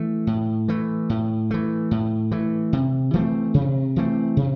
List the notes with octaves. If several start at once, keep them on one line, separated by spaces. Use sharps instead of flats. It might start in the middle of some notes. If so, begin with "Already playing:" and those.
Already playing: E3 A3
A2
E3 A3
A2
E3 A3
A2
E3 A3
C3
E3 A3 C4
C3
E3 A3 C4
C3